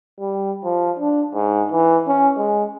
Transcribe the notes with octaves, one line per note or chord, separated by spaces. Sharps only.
G3
F3
D4
G#2
E3
C#4
G#3